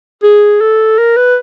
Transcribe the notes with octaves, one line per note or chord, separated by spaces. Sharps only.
G#4
A4
A#4
B4